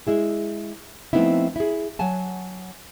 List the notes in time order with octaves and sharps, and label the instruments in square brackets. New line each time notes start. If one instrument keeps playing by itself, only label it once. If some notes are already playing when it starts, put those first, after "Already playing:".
[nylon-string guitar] G#3 E4 G#4
F3 A3 B3 C4 D#4 E4
E4 G#4
F#3 F#5 G#5 A5